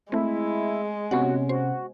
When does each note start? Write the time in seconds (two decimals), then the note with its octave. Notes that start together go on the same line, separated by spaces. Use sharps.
0.12 G#3 A3 C4 E4
1.11 C3 B3 C#4 F#4 C#5 F#5
1.49 F#4 C5